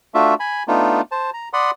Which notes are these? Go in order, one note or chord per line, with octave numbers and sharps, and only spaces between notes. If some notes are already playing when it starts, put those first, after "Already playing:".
A3 D4 F4 F#4 E5
G#5 B5
A3 B3 D4 D#4 F4
C5 A5
A#5
D5 F#5 B5 C6 D#6